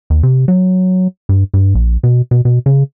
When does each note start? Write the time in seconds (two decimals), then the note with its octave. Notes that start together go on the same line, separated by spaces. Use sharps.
0.10 D#2
0.23 C3
0.48 F#3
1.29 G2
1.54 G2
1.75 A#1
2.03 B2
2.31 B2
2.45 B2
2.66 C#3